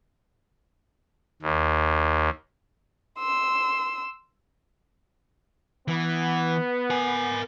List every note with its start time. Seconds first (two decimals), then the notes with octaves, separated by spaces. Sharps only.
1.42 D#2
3.19 C6 E6
5.88 E3 B3
6.90 A#4 G#5